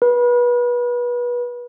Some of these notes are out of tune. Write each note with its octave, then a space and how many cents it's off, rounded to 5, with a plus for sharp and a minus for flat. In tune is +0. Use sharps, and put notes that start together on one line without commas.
B4 -25